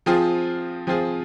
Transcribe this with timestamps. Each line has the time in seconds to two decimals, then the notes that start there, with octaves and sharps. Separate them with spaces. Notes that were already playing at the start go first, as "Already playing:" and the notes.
0.06 F3 C4 F4 G#4
0.87 F3 C4 F4 G#4